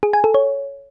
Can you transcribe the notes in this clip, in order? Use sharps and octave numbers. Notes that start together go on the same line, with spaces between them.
G#4
G#5
A4
C#5